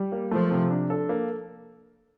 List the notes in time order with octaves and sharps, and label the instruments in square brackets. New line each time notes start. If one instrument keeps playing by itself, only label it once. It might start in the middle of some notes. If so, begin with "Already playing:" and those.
Already playing: [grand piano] G3
A#3
[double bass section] F3 [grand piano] A3
[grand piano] C3
D4
A4
A#3